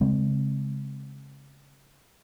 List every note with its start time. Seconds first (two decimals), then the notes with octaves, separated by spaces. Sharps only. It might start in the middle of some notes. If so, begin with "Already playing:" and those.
0.01 C#3 G#3 C4